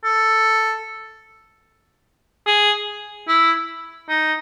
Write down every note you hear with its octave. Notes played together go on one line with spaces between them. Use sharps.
A4
G#4
E4
D#4